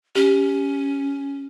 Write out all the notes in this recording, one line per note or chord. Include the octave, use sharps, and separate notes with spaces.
C#4 G4